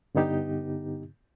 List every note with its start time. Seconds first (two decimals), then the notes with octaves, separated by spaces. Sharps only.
0.15 G2 D3 B3 D#4 G4